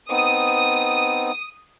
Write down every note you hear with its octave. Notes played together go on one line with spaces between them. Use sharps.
B3 C4 D#4 D#6